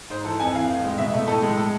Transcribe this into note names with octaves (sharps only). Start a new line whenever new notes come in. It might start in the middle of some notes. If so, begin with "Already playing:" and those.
G#2 C5
E3 A4
F2 G#5
E3 F5
A2
G#3
B2 E5
A3
A2 A4
G#3
A4